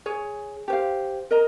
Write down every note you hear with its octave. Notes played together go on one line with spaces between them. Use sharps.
G#4 C#5 G#5
G4 C5 F5
A#4 D#5 A#5